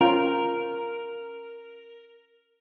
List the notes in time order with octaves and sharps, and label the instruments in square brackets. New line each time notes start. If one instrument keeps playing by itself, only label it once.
[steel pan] C#4 F4 G5 [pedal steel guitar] A#4